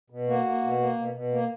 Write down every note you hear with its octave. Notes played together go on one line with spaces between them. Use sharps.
B2
A#3 F#4
A#3
B2
A#3
B2
B2
A#3